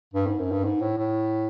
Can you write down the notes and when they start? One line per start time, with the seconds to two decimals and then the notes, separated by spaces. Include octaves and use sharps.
0.14 G2
0.27 G#2
0.39 F#2
0.51 G2
0.65 G#2
0.81 A2
0.98 A2